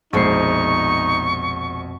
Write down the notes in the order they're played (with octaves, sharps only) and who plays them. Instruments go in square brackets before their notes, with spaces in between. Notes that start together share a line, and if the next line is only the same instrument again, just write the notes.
[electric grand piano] A#1 C5 C7 [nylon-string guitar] F2 B2 G#3 [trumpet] D#4 [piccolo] C#6